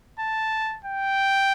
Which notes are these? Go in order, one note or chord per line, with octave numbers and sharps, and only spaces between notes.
A5
G5